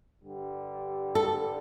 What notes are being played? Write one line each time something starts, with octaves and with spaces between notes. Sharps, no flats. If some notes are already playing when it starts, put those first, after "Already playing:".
G2 D3 G3
A4